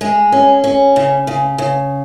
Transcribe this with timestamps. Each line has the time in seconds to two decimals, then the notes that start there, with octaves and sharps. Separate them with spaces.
0.01 G#3 G#4
0.32 C#4
0.64 C#4
0.96 C#3
1.27 C#3
1.58 C#3